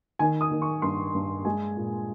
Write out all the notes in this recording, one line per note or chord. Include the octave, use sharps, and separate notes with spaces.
D#3 G#5
D#6
D#3
C#6
G2 C6
G2
G#3 G#5
A#2